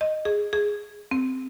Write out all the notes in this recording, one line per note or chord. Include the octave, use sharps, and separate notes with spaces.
D#5
G#4
G#4
C4